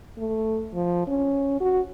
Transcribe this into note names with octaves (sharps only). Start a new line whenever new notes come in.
A3
F3
C#4
F#4